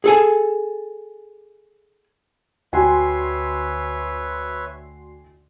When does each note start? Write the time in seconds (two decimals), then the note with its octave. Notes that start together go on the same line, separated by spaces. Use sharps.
0.04 G#4 A4 G#5
2.73 D2 F#4 B4 C#5 E5 G5 G#5 C6